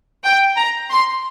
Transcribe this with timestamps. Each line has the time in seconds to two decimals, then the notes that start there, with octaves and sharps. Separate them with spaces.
0.24 G5
0.56 A#5
0.90 C6